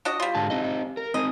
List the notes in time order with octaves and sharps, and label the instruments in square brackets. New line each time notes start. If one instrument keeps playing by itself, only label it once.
[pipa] D4 F#4 D#5
G3 F4
[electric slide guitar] G#2 D3 A5
C4 D#4 D#5
A#4
[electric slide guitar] C4 D#4 [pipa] D#5